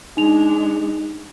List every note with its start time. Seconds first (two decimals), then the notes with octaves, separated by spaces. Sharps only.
0.17 G#3 D4 D#4 F7